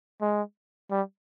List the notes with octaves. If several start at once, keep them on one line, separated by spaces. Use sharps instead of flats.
G#3
G3